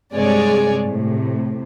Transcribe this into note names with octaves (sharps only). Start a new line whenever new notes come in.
G2 C3 G#3 C#5 D5 G#5
A2 C3